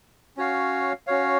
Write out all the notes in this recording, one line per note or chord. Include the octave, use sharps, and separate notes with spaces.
C#4 F#4 C#5 F5
C#4 F#4 C#5 F5